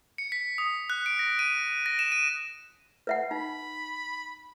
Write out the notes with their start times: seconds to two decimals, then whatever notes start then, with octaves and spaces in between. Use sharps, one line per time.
0.18 C#7
0.32 B6
0.58 D#6
0.90 F#6
1.06 D7
1.19 A#6
1.39 D#7
1.86 A#6
1.99 E7
2.12 D#7
3.07 B4 E5 F#5
3.31 D#4 B5